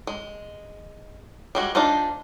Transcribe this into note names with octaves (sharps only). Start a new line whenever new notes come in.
G#3
G3 G#3 F#4
D4 D#4 F4 G#4 C5